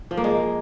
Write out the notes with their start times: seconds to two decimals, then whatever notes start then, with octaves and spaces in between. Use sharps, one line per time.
0.11 F3
0.17 A#3
0.24 G#3